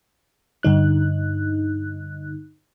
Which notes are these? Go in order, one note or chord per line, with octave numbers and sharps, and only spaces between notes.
G2 D3 D#4 F#6